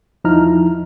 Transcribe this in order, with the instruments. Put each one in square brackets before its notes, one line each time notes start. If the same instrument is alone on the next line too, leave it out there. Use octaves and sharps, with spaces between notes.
[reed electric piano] E2 F3 D#4 E4 A#5 F6